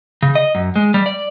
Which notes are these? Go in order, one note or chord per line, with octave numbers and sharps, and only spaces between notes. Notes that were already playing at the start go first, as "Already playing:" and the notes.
C#3
D#5
F#2
G#3
G3
D5